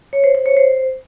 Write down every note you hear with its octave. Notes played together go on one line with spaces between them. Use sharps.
C#5
C5
C5
C#5
C5